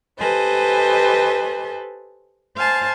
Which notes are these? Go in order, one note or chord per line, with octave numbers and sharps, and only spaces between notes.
G4 A4 B4 C5 D#5 G#5
C5 F5 G#5 A5